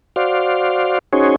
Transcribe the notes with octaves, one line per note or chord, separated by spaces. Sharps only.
F#4 C5 D5 F5
C#4 D#4 F#4 G#4 C5 C#5